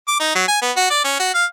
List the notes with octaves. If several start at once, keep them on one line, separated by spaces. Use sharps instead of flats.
D6
D#4
F#3
G#5
B3
F#4
D5
C#4
F#4
F5